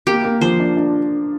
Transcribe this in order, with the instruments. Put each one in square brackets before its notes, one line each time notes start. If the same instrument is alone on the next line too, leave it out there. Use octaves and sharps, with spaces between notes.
[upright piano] A#3 [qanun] G4
[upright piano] A#3
[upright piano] F3 [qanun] C5
[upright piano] D4
D4